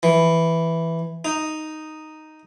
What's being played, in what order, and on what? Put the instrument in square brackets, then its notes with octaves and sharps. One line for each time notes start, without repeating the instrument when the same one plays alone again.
[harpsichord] E3
D#4